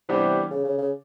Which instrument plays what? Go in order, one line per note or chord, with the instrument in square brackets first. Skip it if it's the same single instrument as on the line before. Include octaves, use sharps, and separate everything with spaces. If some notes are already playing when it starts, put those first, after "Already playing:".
[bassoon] C3 [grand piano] E3 G3 B3 D4 G4
[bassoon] C#3
C#3
C#3